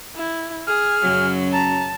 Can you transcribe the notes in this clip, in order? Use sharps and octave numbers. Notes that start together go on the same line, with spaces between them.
E4
G#4 F6
F#2 C#3 F#3
A5 A#5